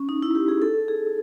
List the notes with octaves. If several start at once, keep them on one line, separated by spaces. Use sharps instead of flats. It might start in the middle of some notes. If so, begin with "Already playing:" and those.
Already playing: C#4
D#4
E4
G4
G#4
A4
G#4